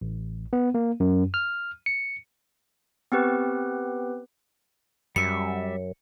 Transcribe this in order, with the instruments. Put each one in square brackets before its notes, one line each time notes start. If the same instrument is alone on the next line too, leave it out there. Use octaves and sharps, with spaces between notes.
[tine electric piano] A1
B3
A#3
F#2
F6
C#7
[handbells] B3 C4 G4 B4
[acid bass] F#2 [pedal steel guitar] G3 E5 [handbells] C#7